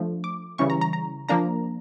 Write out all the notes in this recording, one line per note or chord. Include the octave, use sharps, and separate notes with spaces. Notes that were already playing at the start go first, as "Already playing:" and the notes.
Already playing: F3 A3 D4
D6
C#3 E3 G3 C#4 E4 C#6
A#5
A#5
A#5
F3 A#3 D4 A#5